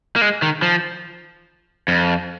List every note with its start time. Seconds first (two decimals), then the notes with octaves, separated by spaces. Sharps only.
0.16 A#3
0.21 G#3
0.42 D#3
0.62 F3
1.88 F2